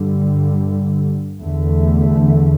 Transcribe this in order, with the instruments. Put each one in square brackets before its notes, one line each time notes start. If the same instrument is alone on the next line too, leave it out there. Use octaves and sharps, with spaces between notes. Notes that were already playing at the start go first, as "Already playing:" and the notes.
Already playing: [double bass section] G2 D3 G3
E2 D3 A3